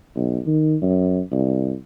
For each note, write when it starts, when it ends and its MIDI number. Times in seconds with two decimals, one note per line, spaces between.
0.16 0.39 35
0.46 0.76 51
0.82 1.20 42
1.32 1.73 36